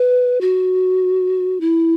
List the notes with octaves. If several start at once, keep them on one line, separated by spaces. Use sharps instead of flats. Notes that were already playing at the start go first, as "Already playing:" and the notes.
Already playing: B4
F#4
E4